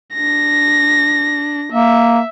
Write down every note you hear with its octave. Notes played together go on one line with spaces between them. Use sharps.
D4 A#6
A#3 E5